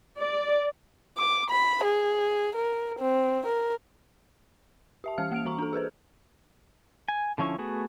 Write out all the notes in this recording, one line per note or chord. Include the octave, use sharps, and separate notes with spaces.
D5
D6
B5
G#4
A#4
C4
A#4
G4 E5 A5
E3 C#4 F5 F6
A#3 F6 D7 F7
E3 F#4 A#5 C#6
D4 A4
G#4 A4 B4 C5
G#5
D3 F3 C#4 E4 C#6
A3 B3 F#4 G#4